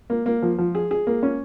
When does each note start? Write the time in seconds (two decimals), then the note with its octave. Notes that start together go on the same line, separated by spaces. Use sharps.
0.10 A#3
0.26 A#3
0.42 F3
0.58 F3
0.75 G#4
0.91 G#4
1.07 A#3
1.23 C#4